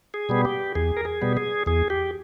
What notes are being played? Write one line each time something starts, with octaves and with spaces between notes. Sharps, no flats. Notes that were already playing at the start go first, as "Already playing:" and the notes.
G#4
B2 G3 B3
G4
E2 G#4
A#4
G#4
B2 G3 B3
G#4
E2 G#4
G4